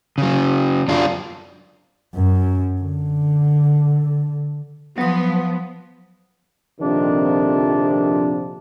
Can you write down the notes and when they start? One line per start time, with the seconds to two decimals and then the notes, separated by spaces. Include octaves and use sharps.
0.18 C#3 F#3
0.88 F#2 D4 F4
2.15 F#2
2.82 D3
4.98 F3 F#3 B3 D#6
6.81 A#1 F2 C3 D#3 F3 D4